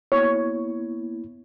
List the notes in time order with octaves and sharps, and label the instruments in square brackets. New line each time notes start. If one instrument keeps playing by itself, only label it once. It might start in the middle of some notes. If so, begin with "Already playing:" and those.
[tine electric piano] A#3 B3 E4 [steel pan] C#5